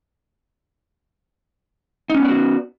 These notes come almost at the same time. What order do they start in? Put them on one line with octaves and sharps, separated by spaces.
D#4 C#4 B3 D5 F#4